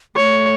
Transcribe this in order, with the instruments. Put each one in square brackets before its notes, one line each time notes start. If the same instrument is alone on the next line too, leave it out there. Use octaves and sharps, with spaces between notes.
[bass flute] A3 [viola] C#5